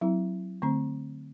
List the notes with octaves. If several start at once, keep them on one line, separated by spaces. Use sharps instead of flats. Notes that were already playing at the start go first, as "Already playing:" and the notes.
F#3 C4 E4
D3 A3 C4